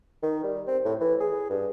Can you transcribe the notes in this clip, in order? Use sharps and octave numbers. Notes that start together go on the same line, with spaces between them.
D#3
G3
C4
A2
E3
G#4
G2